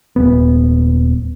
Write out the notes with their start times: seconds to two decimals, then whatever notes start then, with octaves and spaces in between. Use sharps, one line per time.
0.16 D#1 B3